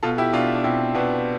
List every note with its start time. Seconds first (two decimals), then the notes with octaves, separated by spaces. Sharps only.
0.03 B2 F4 A4
0.18 E4 G4
0.33 B2 D4 F4
0.55 D4
0.64 B2 C4 E4
0.94 B2 B3 D4